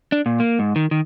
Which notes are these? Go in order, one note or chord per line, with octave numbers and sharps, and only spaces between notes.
D4
A#2
A#3
G#2
D#3
D#3